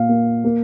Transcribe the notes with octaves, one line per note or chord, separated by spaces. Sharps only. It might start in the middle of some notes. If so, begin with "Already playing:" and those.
Already playing: A#2 F5
A#3
A#3